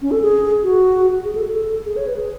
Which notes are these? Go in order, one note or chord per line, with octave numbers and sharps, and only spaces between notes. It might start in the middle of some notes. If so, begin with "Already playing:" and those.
C#4
A4
G#4
F#4
G#4
A4
A4
G#4
C#5
B4
G#4